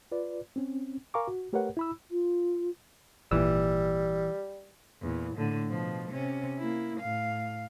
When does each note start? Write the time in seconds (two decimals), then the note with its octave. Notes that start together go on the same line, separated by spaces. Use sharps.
0.12 F4 B4 D5
0.56 C4 C#4
1.14 A#4 F5 G#5 A#5 C#6 D6
1.28 F#4
1.53 A3 G4 A#4 B4 C#5 F#5
1.77 E4 B5 E6
2.11 F4
3.31 G#1 A#2 E3 G3 E6
5.01 E2 A#2
5.37 A2 D3
5.68 B2 F3
6.11 C3 C#4
6.59 A#3 E4
7.00 A2 F5